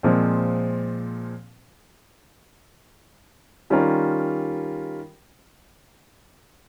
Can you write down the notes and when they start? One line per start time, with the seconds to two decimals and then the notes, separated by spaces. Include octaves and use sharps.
0.03 A#2 F3 G#3 C4
3.70 D#3 G3 C#4 F4 A#4